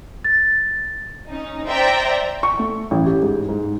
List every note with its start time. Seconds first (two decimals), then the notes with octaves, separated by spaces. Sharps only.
0.24 A6
1.29 C#4 D#4
1.67 C5 D5 E5 G5 A#5
2.43 C#6
2.59 A3
2.91 A1
3.06 G4
3.22 G#2
3.49 G#2